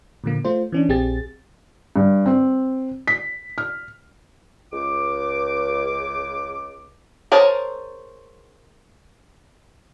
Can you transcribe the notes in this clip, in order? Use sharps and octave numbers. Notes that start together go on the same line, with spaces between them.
A#2 D3 F3 A#3
A3 F4 C5
E3 C#4 D4
A#1 C4 G4 G#4 A6
G2
C4
B6
F6
C#2 D6
G#4 A#4 C5 C#5 A5